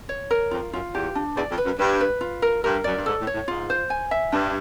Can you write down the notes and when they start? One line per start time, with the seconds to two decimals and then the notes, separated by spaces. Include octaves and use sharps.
0.09 C#5
0.31 A#4
0.51 F2 F4
0.73 F#2 F4
0.94 E2 G4
1.15 D4
1.36 E2 D5
1.50 F2
1.58 B4
1.65 F#2
1.79 G2 B4
2.01 B4
2.21 F4
2.42 A#4
2.64 G2 A#4
2.84 F#2 D5
2.96 G2
3.06 G#2 A4
3.20 A2
3.27 C#5
3.34 A2
3.48 G#2 F4
3.70 C5
3.90 G#5
4.11 E5
4.32 G2 D4